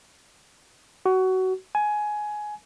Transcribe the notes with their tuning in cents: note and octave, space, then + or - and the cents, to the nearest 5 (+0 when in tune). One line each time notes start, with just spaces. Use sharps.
F#4 +20
G#5 +15